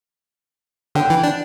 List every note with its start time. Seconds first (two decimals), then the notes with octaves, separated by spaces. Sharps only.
0.95 D3 G5
1.10 E3
1.24 D4